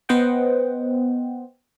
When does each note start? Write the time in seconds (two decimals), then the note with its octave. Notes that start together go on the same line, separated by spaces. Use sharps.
0.09 B3 C5 D#5 F#5 G5